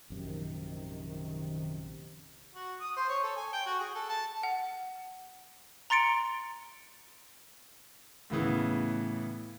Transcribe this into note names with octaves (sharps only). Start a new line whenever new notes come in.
A#1 F#2 C3 D#3
F#4
D#6
C5
C#5
A4
G#5
G5
F#4
G#4
A4
A5
F#5
A#5 C6 A6 C#7 D7
A2 C#3 E3 B3